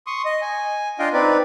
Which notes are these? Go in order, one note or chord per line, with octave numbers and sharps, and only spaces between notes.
C6 C#6 D#6
D#5
G#5
D4 F4 D#5 F5 G5
C4 D#4 B4 D5